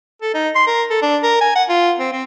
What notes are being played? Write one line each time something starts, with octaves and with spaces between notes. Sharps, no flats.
A4
D#4
C6
A#4
A4
D4
A#4
G#5
F#5
F4
C4
C4